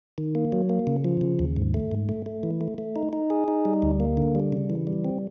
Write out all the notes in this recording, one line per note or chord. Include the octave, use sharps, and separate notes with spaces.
D#3
A#3
F#3
A#3
C#3
F3
C#3
D#2
G#2
A3
G#2
A3
A3
E3
A3
A3
D#4
D#4
G#4
D#4
G3
D2
A#3
D3
G3
C#3
E3
G3
C4